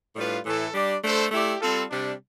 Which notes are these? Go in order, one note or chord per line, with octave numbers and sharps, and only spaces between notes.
A2 G3 D4 F4 B4
A2 E3 A3 E4 A4
G3 D4 G4 D5
A3 D4 A4 C5
A3 E4 G4 D5
G3 C4 F4 A4
C3 G3 D4